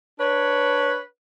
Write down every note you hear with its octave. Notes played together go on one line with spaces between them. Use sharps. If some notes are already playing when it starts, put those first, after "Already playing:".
D4 B4 C#5